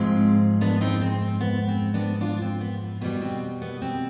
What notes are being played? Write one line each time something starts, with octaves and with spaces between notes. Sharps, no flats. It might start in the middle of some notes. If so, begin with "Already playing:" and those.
Already playing: G#2 F3 G#3 C4
B3 D4
C4 D#4
C4
C4
B3
C4
B3 D4
D4 F4
C4
B3
B2 G3 B3
C4
B3
C4